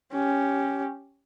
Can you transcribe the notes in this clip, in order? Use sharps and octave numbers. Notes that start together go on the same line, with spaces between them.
C#4 G4